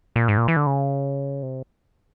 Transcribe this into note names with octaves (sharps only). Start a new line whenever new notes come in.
A#2
G#2
A#2
E3
D3
C#3
C3